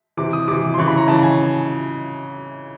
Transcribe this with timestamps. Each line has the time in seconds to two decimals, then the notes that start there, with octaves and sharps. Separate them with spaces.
0.17 C3 E3 D6
0.33 D#6
0.48 C3 E3 D6
0.74 C6
0.78 C#3 E3 C#6
0.88 B5
0.97 A#5
1.07 C#3 E3 A5
1.23 G#5